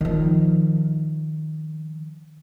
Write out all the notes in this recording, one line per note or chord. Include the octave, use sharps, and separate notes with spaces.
D#3 F3